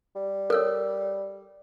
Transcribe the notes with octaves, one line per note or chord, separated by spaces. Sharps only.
G3
A4 A#4 C#5 E6